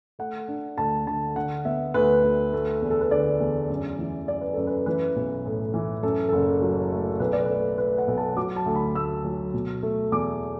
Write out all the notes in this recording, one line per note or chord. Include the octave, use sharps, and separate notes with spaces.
A3 F#5
D4
D2 A5
D3 A5
D3 F#5
B3 E5
D2 B4
D2
A3
E2
A4
B4
D3 D5
E2
F#2
E3
F#2 D5
B4
F#2 A4
B4
E3 B4
B1
A2
E3
F#2 A4
F#1 A4
F#3
A3
B1 B4
D5
A3 B4
A3 B4
F#5
B1
A5
F#3 D6
A5
D2
B5
D2 E6
F#3
B2
A3
E2 D6